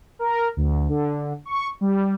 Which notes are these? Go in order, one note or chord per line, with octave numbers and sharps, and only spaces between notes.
A#4
D2
D3
C#6
G3